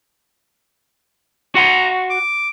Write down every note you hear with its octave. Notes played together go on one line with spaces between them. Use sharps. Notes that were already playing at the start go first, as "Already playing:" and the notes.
F#4 F#5 A#5 C6
D6